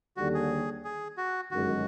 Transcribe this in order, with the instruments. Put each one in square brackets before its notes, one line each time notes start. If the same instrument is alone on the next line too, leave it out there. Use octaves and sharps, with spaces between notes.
[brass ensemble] D#2 D3 G3 [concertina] F#4
[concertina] G#4
G#4
F#4
[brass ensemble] G1 F#2 D#3 G#3 [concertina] F#4